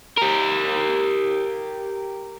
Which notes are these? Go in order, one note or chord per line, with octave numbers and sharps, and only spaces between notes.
G4 A#4